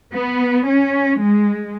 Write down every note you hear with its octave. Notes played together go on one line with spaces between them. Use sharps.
B3
C#4
G#3